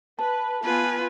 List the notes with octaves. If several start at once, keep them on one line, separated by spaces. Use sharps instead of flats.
B4 A5
B3 F4 B4 G#5